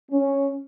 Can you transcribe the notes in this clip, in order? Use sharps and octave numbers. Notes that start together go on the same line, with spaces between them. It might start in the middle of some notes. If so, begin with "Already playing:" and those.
C#4